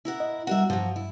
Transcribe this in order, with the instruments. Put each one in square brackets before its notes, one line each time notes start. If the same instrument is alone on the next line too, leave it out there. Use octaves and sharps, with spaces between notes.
[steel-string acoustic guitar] E4 A#4 F#5
[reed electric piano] D#5
[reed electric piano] G3 F#5 [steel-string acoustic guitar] F#4 A#4 E5
[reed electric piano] G2 [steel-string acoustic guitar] F3 F#3
[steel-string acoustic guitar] E4